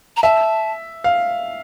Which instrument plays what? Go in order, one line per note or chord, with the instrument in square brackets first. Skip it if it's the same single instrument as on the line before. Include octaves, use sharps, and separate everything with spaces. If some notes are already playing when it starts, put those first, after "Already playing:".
[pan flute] A#5
[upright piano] E5 [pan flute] A5
[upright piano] F5